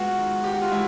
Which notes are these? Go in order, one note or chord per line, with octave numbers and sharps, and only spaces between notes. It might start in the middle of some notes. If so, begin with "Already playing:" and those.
Already playing: G#3 B3 F4 F#4
D#3
B3 G4
F#4
F4
G#3 E4